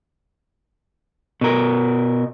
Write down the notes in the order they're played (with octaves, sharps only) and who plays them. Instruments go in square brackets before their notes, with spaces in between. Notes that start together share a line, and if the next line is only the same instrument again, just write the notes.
[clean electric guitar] B2 A#4